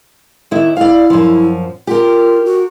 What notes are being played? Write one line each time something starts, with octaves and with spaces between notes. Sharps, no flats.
D#2 D#3 E4
E4 D5 F5
F#2 F3
F4 G4 A#4
F#4